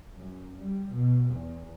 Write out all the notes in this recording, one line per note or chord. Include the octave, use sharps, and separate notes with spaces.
F#2
G3
B2
E2